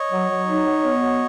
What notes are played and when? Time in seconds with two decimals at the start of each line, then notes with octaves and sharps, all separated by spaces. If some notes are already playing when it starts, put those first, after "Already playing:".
Already playing: C#5 D#5
0.11 F#3
0.30 F#3
0.47 D#4
0.65 F#3
0.84 B3
1.02 F#3